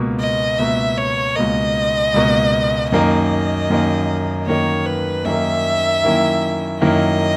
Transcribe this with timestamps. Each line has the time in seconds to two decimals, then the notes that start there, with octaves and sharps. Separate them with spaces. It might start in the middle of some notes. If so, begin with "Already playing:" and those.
Already playing: C#2 B2 A#3
0.20 D#5
0.58 C#2 B2 A#3 E5
0.98 C#5
1.36 C#2 B2 A#3 D#5
2.14 C#2 B2 A#3
2.92 F#2 D#3 A#3 D#4 D#5
3.70 F#2 D#3 A#3 D#4
4.47 F#2 D#3 A#3 D#4 C#5
4.87 B4
5.25 F#2 D#3 A#3 D#4 E5
6.03 F#2 D#3 A#3 E4
6.81 F#2 D#3 A#3 E4 D#5